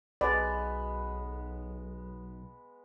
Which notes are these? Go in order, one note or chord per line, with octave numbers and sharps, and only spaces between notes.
B1 G#3 B3 D5